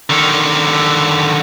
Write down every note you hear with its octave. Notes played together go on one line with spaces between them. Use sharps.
D3 D#3